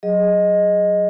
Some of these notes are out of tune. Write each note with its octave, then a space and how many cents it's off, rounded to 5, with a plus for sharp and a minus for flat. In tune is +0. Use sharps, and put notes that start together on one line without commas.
F#3 +0 G#4 -5 D#5 +0